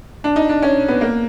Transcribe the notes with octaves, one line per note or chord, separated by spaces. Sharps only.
D4
D#4
D4
C#4
B3
A#3